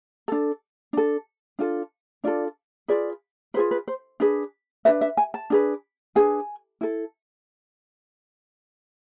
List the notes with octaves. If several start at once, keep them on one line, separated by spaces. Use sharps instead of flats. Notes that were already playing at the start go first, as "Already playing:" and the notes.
D4 A4
D4 A4
D4 F4 A4
D4 F4 A4 D5
F4 G#4 B4 D5
F4 G#4 B4 C5
B4
C5
D4 G#4 B4
D4 G#4 B4 E5
E5
G#5
A5
D4 G#4 B4
D4 G#4 B4 G#5
E4 A4